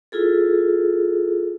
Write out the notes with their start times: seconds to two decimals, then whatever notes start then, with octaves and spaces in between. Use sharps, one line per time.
0.12 E4 F4 G#4 A4